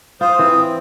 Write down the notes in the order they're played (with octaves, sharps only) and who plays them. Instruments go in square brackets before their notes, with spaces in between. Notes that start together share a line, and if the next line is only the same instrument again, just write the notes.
[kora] F4 [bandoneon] C5 [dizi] D#6
[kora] E3 [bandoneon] C4